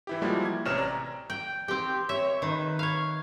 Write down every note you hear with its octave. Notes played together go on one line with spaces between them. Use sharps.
E3 E4 G4
F3 G3 G#3 A#3 E4 F#4
G#6
A1 C3 B4 C#5 F6 E7
D5 A#5
G5
C4 G4 G5
C#5 E5
D#3 B4
C#5 F5